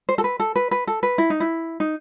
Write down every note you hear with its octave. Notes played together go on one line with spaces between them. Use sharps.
C5
A4
B4
A4
B4
B4
A4
B4
E4
D#4
E4
D#4